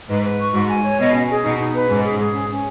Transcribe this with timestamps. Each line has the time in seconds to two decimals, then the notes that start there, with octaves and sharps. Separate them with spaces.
0.09 G#2 B4
0.24 B4
0.39 C#6
0.53 G#2 F#4
0.69 G#5
0.84 C#5
0.99 B2 D#5
1.14 C#4
1.29 G#4
1.44 B2 D#4
1.59 D#4
1.73 B4
1.89 G#2 C#4
2.04 G#4
2.19 G#4
2.33 C#4
2.49 C#4